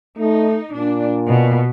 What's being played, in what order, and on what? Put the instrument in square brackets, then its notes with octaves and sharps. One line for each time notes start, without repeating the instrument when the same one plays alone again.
[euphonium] A3 [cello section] D#4
[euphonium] A#2 [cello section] D4
[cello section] B2